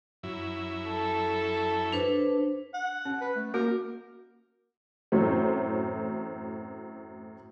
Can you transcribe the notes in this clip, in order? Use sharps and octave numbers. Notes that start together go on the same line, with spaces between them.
F#2 E4
A4
D4 B4 C5
F#5
C#4
B4
A3
A#3 F#4 A#4
F#2 A2 E3 F#3 A3 C4